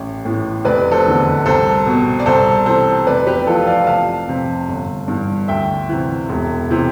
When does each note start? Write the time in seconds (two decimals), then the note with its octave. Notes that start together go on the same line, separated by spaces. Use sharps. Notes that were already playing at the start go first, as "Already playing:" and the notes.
Already playing: A1 E5
0.25 A2 E3
0.65 F1 B4 D5
0.91 A4 C5
1.05 E2 D3
1.46 C2 A4 C5
1.87 B2
2.20 D5
2.26 C2 A4 C5
2.66 C3 E3 A4 C5
3.07 F1 B4 D5
3.27 G4 B4
3.47 F2 E3 F4 A4
3.67 D5 F5
3.87 F1 F5 A5
4.27 F2 C3
4.68 G1
5.08 G2 E3
5.48 D2 E5 G5
5.89 C3 E3
6.29 E1
6.70 C3 E3